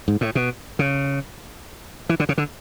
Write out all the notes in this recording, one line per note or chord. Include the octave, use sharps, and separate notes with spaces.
G#2
A2
B2
C#3
E3
D3
C#3
D3